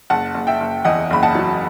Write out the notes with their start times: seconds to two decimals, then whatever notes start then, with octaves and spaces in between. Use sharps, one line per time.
0.10 F#1 F#5 A5
0.34 F#1
0.47 E5 G5
0.60 F#1
0.85 E2 D#5 F#5
1.10 F#1 B5
1.22 F#5 A5
1.35 F#3